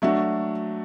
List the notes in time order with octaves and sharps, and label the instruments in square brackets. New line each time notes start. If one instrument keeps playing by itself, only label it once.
[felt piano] F#3 A3 D4 F#4